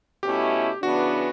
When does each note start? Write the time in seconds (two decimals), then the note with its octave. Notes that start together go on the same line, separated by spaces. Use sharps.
0.23 B2 A3 C#4 E4 G4
0.83 C#3 E3 B3 D4 F#4